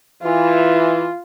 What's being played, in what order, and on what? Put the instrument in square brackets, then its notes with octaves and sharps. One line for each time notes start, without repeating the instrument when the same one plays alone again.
[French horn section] E3 [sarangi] F4